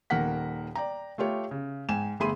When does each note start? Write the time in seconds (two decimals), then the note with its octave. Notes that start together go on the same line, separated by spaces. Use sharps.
0.10 D#1 D#3 A#3 A#4 F#5 B6
0.75 D5 G5 A#5
1.18 A3 F4 G4 C#5
1.51 C#3
1.89 G#2 G5 G#5 E7
2.20 G1 A3 G#4 B5 C6 D#7